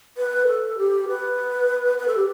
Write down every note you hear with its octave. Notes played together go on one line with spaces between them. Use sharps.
B4
A4
G4
B4
B4
A4
G4